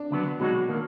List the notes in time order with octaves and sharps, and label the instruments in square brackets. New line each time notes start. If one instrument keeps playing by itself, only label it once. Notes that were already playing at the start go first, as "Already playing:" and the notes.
Already playing: [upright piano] D4
[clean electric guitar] D2 D3 F#3 B3
[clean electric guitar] B2 G#3 D#4 F#4 [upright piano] F#3
[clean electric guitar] D#3 A#3